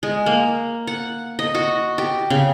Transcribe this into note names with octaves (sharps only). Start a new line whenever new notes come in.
G#3
A#3
F#5
D#5
F#4
G4
C#3